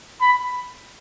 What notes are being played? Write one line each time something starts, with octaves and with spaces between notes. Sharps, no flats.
B5